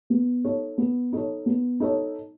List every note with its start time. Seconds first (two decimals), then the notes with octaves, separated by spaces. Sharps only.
0.10 B3
0.44 D#4 A4 C#5
0.78 B3
1.13 D#4 A4 C#5
1.46 B3
1.80 D#4 A4 C#5